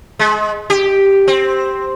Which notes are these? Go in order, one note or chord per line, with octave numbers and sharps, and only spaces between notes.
G#3
G4
C4